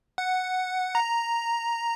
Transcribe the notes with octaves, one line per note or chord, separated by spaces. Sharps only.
F#5
A#5